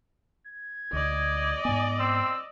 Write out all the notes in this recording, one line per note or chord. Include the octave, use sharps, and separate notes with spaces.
G#6
D2 D5 D#5
G#2 B3 G#5
C4 E6